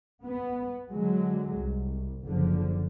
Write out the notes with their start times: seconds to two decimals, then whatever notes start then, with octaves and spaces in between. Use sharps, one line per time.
0.24 B3
0.90 D3 F#3 G#3
1.57 C2
2.22 F#1 D3 F3